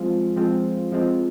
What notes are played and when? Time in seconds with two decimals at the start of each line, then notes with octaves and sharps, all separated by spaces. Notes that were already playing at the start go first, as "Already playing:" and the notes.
Already playing: F3 G#3 C4 F4
0.36 F3 G#3 C4 F4
0.92 F3 G#3 C4 F4